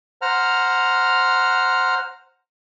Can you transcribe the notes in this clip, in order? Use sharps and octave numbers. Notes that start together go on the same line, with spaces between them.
C5 F#5 A#5 F6